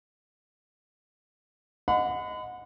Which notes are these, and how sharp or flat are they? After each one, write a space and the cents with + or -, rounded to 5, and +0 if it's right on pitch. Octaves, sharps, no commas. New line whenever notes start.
D#5 +0 F#5 -25 B5 +40